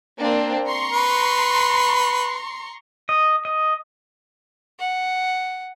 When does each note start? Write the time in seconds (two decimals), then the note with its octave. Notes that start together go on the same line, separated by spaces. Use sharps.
0.19 A#3 C4 D4
0.65 A#5 C6 C#6
0.93 B4
3.09 D#5
3.45 D#5
4.79 F#5